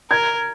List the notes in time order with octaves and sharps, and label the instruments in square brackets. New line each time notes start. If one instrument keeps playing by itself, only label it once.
[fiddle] A#4 [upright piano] G#6